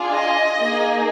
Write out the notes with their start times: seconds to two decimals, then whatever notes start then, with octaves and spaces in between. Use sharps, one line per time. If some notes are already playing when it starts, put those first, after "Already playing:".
Already playing: D4 F4 G#4
0.13 D#5
0.58 A#3 D#4 G#4